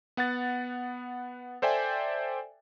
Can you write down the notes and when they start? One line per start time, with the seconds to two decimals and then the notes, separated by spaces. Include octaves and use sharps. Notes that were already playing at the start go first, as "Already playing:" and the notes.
0.17 B3 F#5 F#6 A6
1.62 A4 C5 D5 E5 G5 G#5